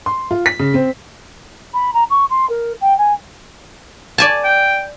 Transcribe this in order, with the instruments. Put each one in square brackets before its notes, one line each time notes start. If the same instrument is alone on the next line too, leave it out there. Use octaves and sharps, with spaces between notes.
[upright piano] C6
F4
B6
C#3
C4
[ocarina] B5
A#5
C#6
C6
A#4
G5
G#5
[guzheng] D5 G#5 A5
[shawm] G5